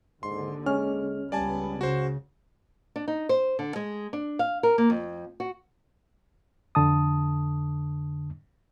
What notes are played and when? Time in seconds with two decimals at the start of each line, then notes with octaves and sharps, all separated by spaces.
0.23 D#2 G#2 D3 C6
0.66 G#3 C#4 F6
1.32 C#2 G3 B3 D5 G#5 A5
1.81 C#3 F#4 C5
2.96 D4
3.08 D#4
3.29 C5
3.59 D3
3.76 G#3
4.13 D4
4.39 F5
4.63 A#4
4.78 A#3
4.90 F2
5.40 F#4
6.75 F2 D3 A5 D#6